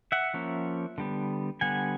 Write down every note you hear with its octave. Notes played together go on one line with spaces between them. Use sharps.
E5 F#5
F3 A#3 C#4
D3 G3 B3
D3 G3 B3 F#5 G#5